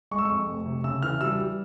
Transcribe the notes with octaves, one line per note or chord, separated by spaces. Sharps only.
G#3 C#6
E6
F2 C#6
F1
C3
C#3 E6
E3 F6
G3 E6
G3